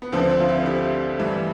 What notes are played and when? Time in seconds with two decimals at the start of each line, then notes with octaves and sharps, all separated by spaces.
0.02 B3
0.12 D2 D3 F3 C4
0.30 C4
0.40 F4
0.48 C4 E4
0.66 E4 G4
1.19 G2 E3